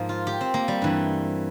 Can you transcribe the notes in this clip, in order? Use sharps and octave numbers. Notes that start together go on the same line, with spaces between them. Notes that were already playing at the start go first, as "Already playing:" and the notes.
Already playing: G#2 F3 A#3
F4
G4
C4
A#3
G3
G2 E3